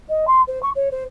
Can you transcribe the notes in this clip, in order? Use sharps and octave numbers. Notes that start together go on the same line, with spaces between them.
D#5
C6
C5
C#6
C#5
C5